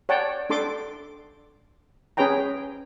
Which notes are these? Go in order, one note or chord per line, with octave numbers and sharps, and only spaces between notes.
C#5 D5 F#5 G5 A5
D4 A4 C6 D6
C#4 G#4 B4 C#5 G5 A#5